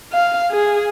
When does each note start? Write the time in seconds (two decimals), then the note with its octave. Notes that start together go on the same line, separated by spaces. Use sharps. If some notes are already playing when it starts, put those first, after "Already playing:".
0.13 F5
0.51 G#4